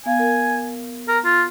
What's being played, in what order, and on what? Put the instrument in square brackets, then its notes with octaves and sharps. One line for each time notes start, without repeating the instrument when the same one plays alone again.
[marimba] B3 F5 [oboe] G#5
[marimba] A#4
[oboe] A#4
F4